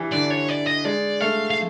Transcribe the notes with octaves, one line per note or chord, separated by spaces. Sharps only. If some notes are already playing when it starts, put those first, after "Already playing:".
Already playing: E3 G3
D3 D5
C#5
D5
D#5
G#3 D5
A3 F5
F5